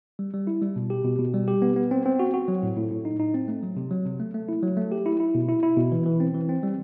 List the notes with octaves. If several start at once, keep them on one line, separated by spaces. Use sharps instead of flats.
G3
G3
E4
G3
B2
G4
B2
B2
G3
G4
B3
B3
C4
C4
F#4
F#4
F#3
A2
A2
A2
D#4
D#4
C4
A3
F#3
C3
F#3
C3
A3
A3
E4
F#3
A3
G4
E4
E4
B2
E4
E4
B2
E3
E3
C4
E3
C4
G3